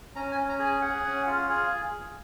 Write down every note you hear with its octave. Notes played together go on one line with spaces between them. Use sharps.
C#4 A#5
G#5
C#4
A#5
G#4
G#5
G#4 F#5
C#4
F4
G#4